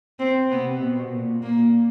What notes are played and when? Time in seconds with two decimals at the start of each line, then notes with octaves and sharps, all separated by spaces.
0.19 C4
0.50 C3 B3
0.81 B2
1.12 A#2
1.43 A#2 A#3